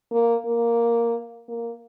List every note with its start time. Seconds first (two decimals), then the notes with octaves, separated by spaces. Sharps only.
0.11 A#3
0.46 A#3
1.48 A#3